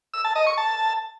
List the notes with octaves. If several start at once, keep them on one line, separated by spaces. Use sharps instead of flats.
E6
A5
D#5
C#6
A5